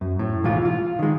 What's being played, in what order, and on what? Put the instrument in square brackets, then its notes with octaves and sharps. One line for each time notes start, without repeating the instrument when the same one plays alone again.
[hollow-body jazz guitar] F#2
A2
B1 E3 G#3 F4
F4
D#3 G#3